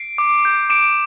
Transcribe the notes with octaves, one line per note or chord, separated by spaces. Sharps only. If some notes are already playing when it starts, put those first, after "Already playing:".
Already playing: C7 D7
D6
G6
D6 D7 E7